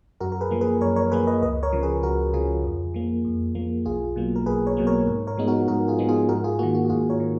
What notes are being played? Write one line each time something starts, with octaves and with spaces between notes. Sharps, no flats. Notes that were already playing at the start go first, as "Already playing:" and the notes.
F#2 F#4 A#4
A#4
G#4 B4
F3 A#3
G#4 B4
F#2 A#4 C#5
A#4 C#5
F3 A#3 G#4 B4
B4 D#5
C#2 B4 D#5
A#4 C#5
C#3 F3
G#4 B4
C#2 F#4 A#4
C#3 F3 F4 G#4
F2
F3 A#3
F2
F3 A#3
B1 F4 G#4
B2 F#3 A#3
A#4
B1 G#4 B4
A#4 C#5
B2 F#3 A#3
A#4 C#5
G#2
A#4 C#5
F3 G#3 B3 D#4
F#4 A#4
G#2 F#4 A#4
F4 G#4
F3 G#3 B3 D#4
F4 G#4
G#2 F#4 A#4
F4 G#4
D#3 A#3 F#4
F#4
F#4
G#2 F4 G#4
A#4 C#5
D#3